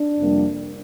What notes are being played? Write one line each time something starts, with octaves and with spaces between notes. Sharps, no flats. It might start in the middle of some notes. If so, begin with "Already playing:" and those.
Already playing: D4
F2 C3 G3 A#3